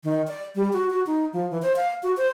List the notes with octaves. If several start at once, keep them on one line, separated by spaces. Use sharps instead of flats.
D#3
D5
G3
F#4
F#4
D#4
F3
E3
C5
F5
F#4
C5